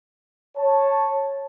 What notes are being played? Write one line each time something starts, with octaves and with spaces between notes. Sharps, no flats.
C#5 A5